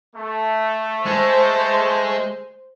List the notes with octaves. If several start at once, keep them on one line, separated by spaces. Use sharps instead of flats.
A3
G#3 C5